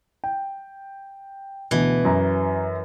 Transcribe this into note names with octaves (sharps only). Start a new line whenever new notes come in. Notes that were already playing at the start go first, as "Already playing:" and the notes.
G5
D2 B2 E3
F#2 A#5